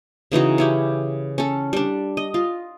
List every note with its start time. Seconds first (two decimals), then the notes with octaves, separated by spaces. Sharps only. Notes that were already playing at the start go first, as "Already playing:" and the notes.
0.32 C#3 E3 D#4 F#4
0.58 C#4 E4 G4
1.38 C#4 A4
1.73 G3 D4
2.17 D#5
2.34 F4